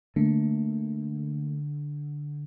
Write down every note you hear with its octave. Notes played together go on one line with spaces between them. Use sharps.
D3 A3 A#3